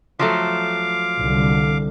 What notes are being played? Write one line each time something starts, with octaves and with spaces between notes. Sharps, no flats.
F3 F#3 A3 F5 D6
C2 D3